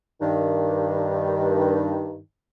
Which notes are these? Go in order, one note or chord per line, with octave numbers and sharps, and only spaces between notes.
G2 D#3